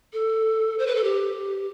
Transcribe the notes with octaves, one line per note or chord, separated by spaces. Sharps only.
A4
C5
B4
A4
G4